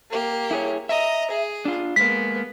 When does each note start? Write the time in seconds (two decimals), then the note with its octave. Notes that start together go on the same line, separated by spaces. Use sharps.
0.11 A#3 G4
0.51 E4 G#4 C#5
0.89 D#5 E5 A#5
1.31 G#4
1.65 D4 F4
1.96 G#3 A#3 B3 B6